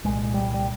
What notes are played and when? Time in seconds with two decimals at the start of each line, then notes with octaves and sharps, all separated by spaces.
0.04 C2 A#2 G#3
0.34 G3
0.54 G3